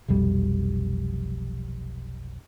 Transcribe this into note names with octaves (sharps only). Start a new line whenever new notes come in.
F1 B1 F2 G3